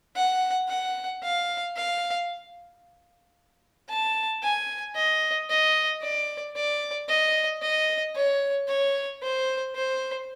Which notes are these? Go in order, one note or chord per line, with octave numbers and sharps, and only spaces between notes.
F#5
F#5
F5
F5
A5
G#5
D#5
D#5
D5
D5
D#5
D#5
C#5
C#5
C5
C5